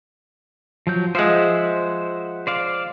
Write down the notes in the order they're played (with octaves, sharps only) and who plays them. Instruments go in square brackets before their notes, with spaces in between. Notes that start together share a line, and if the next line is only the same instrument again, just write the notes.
[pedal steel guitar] F3 F#3 G6
[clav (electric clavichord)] F3 G#3 [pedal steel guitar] C5 E5 F#5
[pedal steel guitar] C5 D5 F5